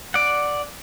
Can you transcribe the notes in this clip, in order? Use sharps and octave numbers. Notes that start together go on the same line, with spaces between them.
D5 F#5